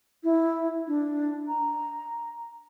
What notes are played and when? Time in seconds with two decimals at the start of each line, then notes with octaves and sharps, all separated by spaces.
0.24 E4
0.88 D4
1.48 A#5